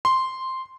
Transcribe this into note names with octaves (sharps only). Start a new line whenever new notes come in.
C6